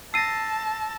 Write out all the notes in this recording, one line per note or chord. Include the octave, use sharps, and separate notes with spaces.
A5 E6 A6 A#6 C7 D#7